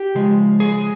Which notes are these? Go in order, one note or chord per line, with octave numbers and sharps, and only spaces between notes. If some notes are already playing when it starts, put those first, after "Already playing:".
Already playing: G4
C#3 F3 G#3
G#4